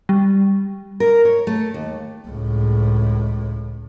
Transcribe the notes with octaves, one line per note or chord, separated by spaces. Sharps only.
G3
A#4
C#5
A3
D#2
C#2 A2